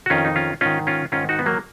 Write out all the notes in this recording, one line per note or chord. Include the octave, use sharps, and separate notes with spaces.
F#4
F2 D#3 C#4 F4
D#4
C#4 F4
G#2 D#3 C#4 F4
C#4 F4
G#2 D#3 C#4 F4
D#4 F#4
B3
F#3 A#3